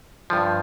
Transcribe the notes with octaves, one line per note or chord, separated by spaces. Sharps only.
G2 D3 F3